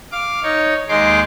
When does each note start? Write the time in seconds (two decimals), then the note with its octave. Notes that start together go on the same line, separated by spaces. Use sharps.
0.12 F5 D6
0.43 D#4 C#5
0.89 D#2 G#3 D#4 C6 D6